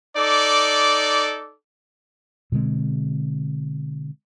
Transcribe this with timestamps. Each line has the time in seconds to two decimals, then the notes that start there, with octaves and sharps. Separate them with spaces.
0.17 D#4 A4 D5 D6
2.52 B2 D3 G#3 C4